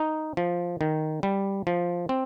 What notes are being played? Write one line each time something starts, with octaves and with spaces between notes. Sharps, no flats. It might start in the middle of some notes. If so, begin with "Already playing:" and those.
Already playing: D#4
F3
D#3
G3
F3
C4